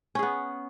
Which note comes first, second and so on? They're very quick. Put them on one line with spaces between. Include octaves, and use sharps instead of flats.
C#4 G#4 B3